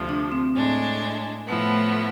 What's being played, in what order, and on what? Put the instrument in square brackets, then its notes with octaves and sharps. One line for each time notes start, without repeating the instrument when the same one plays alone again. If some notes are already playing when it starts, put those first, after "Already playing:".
Already playing: [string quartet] D2 C3 F3
[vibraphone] D4
C4
[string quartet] A2 G#3 D4
[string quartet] A2 F3 B3 E4 [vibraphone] A3